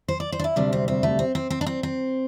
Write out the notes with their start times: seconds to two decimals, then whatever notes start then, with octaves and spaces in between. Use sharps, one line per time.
0.08 C5
0.20 D5
0.32 C5
0.39 D4
0.44 E4
0.56 D2 C3 G3 D4
0.73 C4
0.88 C4
1.03 A3
1.19 C4
1.35 C4
1.50 C4
1.61 D4
1.66 C4
1.83 C4